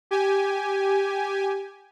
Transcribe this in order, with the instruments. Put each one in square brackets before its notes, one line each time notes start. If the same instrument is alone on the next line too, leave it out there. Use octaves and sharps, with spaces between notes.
[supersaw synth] G4 G#5